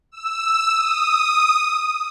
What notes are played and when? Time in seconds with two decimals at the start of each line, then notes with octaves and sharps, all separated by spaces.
0.12 E6
0.71 D#6